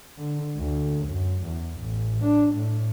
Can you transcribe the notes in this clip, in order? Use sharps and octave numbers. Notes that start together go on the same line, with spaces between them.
D3
D2
F#2
E2
A1
D4
A2